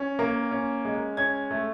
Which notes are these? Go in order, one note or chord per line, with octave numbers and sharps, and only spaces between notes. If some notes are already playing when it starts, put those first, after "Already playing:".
Already playing: C#4
A#3
C#4
G#3
C#4 G#6
A3